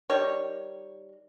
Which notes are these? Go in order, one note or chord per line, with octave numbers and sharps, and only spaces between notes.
D#3 G3 C#5